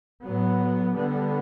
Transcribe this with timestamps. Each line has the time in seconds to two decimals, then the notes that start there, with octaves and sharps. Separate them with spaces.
0.24 A2 F#3 B3
0.94 D3 G3 B3